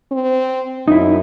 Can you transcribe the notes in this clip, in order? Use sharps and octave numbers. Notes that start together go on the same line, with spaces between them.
C4
F#2 D#4 E4